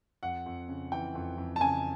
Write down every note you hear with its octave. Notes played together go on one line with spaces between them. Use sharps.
F2 F#5
F2
C#3
E3 G5
F2
F2
A5
C#3 G#5